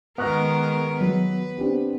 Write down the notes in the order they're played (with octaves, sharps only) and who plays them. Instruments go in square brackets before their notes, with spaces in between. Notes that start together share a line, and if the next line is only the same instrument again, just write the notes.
[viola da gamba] D#3 G#3 A#4 [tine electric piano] B3 [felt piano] C#6 F#6 A#6
[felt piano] F#3 [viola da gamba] B4
[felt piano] C4 D4 G4